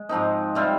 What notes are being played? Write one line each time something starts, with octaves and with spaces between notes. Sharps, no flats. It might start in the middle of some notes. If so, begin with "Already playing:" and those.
Already playing: G#3
G#2 F3 C4 D#4
C3 G3 C4 F4